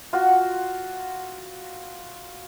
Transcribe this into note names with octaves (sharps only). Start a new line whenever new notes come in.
F4 F#4